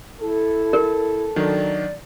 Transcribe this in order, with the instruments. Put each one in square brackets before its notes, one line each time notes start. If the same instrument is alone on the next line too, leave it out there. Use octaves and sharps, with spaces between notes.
[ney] E4 [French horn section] A4
[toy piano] A#4
[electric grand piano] D#3 F#3 D4 [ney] D5